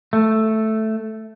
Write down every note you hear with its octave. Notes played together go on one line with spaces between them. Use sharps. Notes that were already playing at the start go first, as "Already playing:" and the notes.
A3